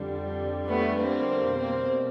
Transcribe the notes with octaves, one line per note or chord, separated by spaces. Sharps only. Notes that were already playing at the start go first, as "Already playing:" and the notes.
Already playing: F2 D3 G3
A3 B3
A#3 C4
B2 G3 A#3 C4